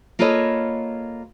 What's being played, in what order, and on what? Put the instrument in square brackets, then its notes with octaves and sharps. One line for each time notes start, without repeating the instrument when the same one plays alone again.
[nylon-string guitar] A#3 F4 A4 B4 C#5 D#5